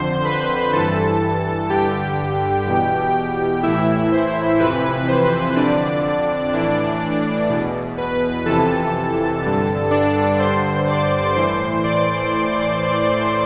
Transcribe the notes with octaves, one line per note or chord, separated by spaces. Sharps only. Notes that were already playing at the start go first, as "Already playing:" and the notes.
Already playing: F2 D3 C5 C6
B4 B5
G2 E3 A4 A5
G2 D3 G4 G5
E2 B2
A2 E3 E4 E5
C5
F2 C3 E3 B4
C5
F2 D3 D4 D5
A2 E3 D4 D5
E2 B2
B4
F2 C3 E3 A4 A5
G2 D3
D4 D5
G2 D3 C5 C6
D5 D6
A2 E3 C5 C6
D5 D6